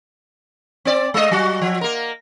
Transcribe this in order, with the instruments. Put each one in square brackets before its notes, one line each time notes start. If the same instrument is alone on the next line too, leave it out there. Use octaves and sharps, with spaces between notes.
[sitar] C4 D5
G#3 D#5
F#3 F#4
F3
A#3 A#4